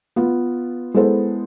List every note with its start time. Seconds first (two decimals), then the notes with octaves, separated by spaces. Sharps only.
0.16 B3 F4 B4
0.94 G#3 B3 E4 A4 C5